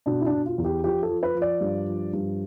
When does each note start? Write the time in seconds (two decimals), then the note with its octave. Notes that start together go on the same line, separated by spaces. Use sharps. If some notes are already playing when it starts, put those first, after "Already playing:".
0.06 B2 D4
0.20 E4
0.26 D4
0.32 B2
0.46 F4
0.58 E2
0.65 G4
0.83 F3 G4
1.03 A4
1.09 F3
1.23 B4
1.35 F3
1.42 D5
1.61 G2
1.86 F3
2.13 G2